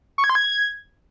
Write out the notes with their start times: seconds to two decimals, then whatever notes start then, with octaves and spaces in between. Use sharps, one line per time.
0.18 C#6
0.24 G#6
0.30 C6
0.35 G#6